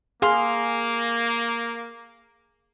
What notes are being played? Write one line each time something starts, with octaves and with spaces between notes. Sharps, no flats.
A#3 G#4 F5 C6